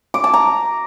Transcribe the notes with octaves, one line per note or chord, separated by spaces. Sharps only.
D6
A5
A#5